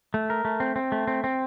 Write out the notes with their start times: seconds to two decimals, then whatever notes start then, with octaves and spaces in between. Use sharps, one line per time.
0.14 A3
0.30 A#4
0.45 A3
0.60 C4
0.76 C4
0.92 A3
1.07 C4
1.24 C4